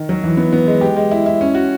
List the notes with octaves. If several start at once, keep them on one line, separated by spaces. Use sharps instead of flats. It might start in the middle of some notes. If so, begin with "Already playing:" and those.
Already playing: D#3
F#3
E3
B3
B3
G#3
G4
G#3
E4
E4
C#4
F#4